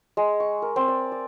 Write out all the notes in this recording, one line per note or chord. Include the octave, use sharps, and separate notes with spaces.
G#3
C#6
A#4
C4
D5
D5